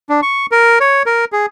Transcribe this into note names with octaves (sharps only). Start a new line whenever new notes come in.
D4
C#6
A#4
C#5
A#4
G#4